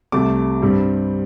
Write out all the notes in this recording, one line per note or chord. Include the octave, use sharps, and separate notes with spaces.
C2 C3 A3 D6
G2 G3 C4